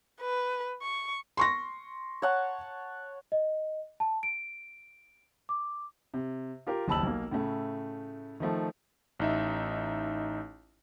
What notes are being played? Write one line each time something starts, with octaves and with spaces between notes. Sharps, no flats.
B4
C#6
C6 C#6 A#6
C#5 F#5 A5
D#5
A5
D7
D6
C3
F4 G4 A#4
F#1 D#2 A5 B5 E6 F#7
B1 A#3
A2 C#3 A3
D#3 F3 A3
A1 D#4 E5